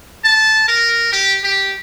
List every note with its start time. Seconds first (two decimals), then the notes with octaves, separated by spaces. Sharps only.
0.24 A5
0.68 A#4
1.12 G4
1.43 G4